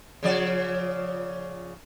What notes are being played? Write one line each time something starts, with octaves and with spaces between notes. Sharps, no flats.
C#3 F3 D5